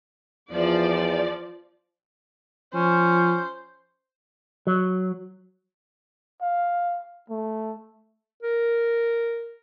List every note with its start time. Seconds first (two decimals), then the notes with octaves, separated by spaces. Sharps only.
0.52 E2 F3 D5
2.74 F3 C#4 C5
4.67 F#3
6.42 F5
7.30 A3
8.43 A#4